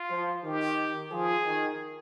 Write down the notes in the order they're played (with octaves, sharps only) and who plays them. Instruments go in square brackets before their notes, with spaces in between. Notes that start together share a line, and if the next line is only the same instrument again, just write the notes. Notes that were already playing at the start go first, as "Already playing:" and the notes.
Already playing: [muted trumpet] F4
[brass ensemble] F3
[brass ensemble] D#3 [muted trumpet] G4
[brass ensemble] F3 [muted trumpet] G#4
[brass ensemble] D#3